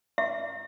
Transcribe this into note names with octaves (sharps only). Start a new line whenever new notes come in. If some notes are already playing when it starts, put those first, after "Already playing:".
E5